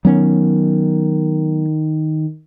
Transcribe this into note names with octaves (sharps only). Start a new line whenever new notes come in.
D#3 F#3 B3 C#4